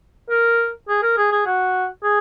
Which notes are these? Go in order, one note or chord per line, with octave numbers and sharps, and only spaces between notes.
A#4
G#4
A#4
G#4
G#4
F#4
G#4